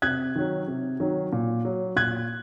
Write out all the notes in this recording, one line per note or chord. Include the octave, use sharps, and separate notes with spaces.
C3 F#6 G#6
D#3 F#3
C3
D#3 F#3
A#2
F#3
A#2 F#6 G#6